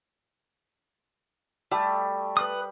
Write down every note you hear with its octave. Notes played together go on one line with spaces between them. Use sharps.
G3 A3
B4 D#6